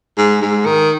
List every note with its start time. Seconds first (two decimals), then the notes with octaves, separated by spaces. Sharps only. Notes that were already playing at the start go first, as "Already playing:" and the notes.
0.17 G#2
0.42 G#2
0.66 D#3